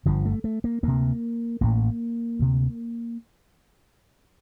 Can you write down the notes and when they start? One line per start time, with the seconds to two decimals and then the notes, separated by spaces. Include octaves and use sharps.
0.06 G1 G2 D3 F3
0.25 A3
0.44 A3
0.64 A#3
0.83 D2 C3 A#3
1.61 A1 A2 A#3
2.39 D2 C3